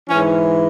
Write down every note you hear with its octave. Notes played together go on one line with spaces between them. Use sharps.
G#2 E3 C#4